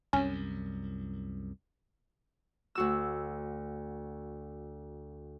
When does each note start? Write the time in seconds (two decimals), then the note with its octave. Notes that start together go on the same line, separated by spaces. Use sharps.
0.13 C2 F#2 C#4
2.75 D2 F#4 E6